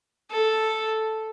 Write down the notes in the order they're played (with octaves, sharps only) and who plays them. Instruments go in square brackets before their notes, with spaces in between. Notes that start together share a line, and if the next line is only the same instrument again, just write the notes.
[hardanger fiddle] A4